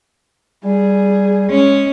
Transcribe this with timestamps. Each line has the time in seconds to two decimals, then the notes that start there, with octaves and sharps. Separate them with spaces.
0.64 G3 G#4
1.50 G#3 C#4